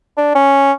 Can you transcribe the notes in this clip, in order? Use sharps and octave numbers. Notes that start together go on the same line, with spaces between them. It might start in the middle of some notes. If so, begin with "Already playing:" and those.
D4
C#4